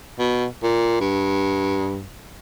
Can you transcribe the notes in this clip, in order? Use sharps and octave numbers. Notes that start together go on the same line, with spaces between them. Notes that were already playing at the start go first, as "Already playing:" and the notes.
B2
A#2
G2